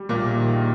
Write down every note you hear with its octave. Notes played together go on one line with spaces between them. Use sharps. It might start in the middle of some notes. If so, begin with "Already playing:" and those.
Already playing: G3
A#1 A#2 A#3
A#1
D#3